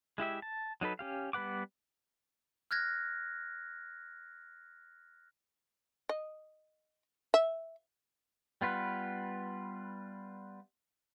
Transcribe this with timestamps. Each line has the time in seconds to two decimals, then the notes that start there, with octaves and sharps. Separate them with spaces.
0.18 G#3 E4 G4 E5
0.42 A5
0.81 F#3 D#4 A4 B4
0.99 C#4 G4 F5
1.33 G3 B3 B4 F#5 D6
2.71 F6 F#6 G#6 A#6
6.09 D#5
7.34 E5
8.61 G3 B3 F4 B4